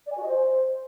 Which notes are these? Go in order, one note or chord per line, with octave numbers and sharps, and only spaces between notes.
D5
G#5
F#4
D#5
C5